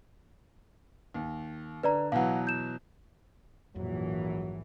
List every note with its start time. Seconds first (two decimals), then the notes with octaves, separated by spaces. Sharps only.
1.14 D#2
1.83 D3 B4 D5 A#5
2.12 B2 E3 F#3 F5 F#5
2.47 G6 E7
3.75 A#1 F2 G#2 E3 F#3